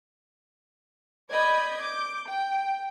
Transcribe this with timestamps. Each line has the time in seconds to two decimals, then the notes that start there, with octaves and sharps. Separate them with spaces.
1.30 D5 D#5 B5 G6 G#6
1.80 D6 G6
2.27 G5